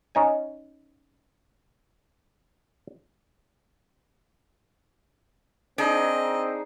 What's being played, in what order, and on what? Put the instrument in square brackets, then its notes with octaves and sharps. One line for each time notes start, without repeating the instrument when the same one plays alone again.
[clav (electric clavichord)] C#4 D#4 G#5
[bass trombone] C4 [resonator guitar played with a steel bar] D4 [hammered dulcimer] D#4 G#4 [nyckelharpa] D#5